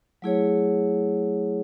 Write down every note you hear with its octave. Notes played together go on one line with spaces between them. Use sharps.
F#3 A3 E4 G#4 C#5